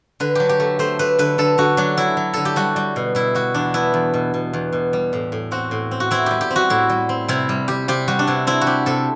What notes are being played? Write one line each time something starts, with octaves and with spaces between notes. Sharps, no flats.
D3 B4
F#3 G4
G4
A3
A3 C5
A3 B4
D3 B4
D3 A4
D3 F#4
F#3 D4
F#3 E4
F#3
D3 A4
G4
G3 F#4
G3
B2
B2 E4
G3 F#4
E2 D4
B3 E4
E2
B2
B2
E2
B2
G3
A2
A2
C4 F#4
A2
C4
F#4
C4 E4
G3 G4
G4
C4
F#4
A2 E4
G3
C4
C3 E4
G3
G3 G4
C3 G4
G3 F#4
D4
C3 E4
C4 E4
F#4
C4 G4
C3 A4